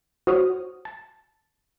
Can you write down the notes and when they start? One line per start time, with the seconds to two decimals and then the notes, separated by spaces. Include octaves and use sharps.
0.27 F#4 C5 C#5 D#6 F6
0.85 A5